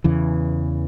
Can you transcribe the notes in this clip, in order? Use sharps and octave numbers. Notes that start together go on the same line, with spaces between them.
E2 C#3 E3